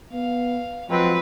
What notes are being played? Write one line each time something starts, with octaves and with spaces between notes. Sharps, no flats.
B3 F5
F3 F#3 G#3 C4 B4